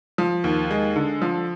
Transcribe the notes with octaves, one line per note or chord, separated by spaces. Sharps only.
F3
D#2
G#3
D3
F3